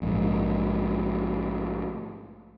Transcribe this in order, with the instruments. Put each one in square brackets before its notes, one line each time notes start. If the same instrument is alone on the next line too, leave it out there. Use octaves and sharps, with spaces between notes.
[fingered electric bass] A#1 G#2